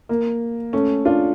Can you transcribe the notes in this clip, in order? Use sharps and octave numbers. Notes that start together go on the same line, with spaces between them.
A#3
A3 C#4
D4 F4